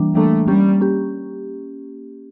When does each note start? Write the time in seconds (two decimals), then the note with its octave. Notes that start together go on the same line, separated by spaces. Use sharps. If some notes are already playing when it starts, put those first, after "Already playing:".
Already playing: E3 G3 A#3 D4
0.15 E3 G3 A3 A#3 D4
0.47 G3 A#3 C#4 G4
0.80 A#3 C#4 G4